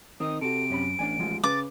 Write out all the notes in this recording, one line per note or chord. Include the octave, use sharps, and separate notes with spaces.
D#3 C4 D#4 D#6
C3 F#4 A4 D7
F#2 C#4 B5
A1 D4 D5 G#5
F3 G#3 F4
C#3 B4 D6 A6